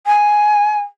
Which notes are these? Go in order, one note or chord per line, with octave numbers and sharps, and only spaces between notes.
G#5